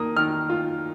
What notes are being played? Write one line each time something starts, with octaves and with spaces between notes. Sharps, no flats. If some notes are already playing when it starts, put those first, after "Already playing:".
Already playing: D#3 A#3 D#6
D#3 F6
F4